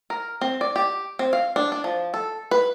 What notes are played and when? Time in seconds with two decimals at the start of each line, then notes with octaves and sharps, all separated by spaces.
0.10 A#4
0.41 C4
0.61 D5
0.76 G4
1.19 C4
1.33 F5
1.56 D4
1.72 D4
1.84 F3
2.14 A4
2.51 B4